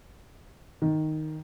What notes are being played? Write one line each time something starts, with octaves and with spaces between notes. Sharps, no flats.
D#3